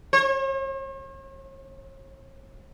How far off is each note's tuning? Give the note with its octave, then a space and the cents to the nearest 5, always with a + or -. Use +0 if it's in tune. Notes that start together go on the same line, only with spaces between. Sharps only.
C#5 -45